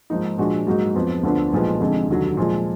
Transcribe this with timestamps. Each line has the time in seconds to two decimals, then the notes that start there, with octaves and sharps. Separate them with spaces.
0.10 G#2 F3 A#3 D#4
0.38 A#2 F3 G#3 D4 F#4
0.67 G#2 F#3 A#3 D#4 F#4
0.94 F2 F3 B3
1.23 D2 D3 F3 B3 D4
1.52 B1 A#2 F3 G#3 B3
1.80 F1 F2 D3 G#3
2.09 F1 D#2 D3 F#3
2.37 A#2 F3 G#3